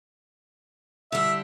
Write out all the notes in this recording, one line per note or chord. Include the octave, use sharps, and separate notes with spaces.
D3 G3 E5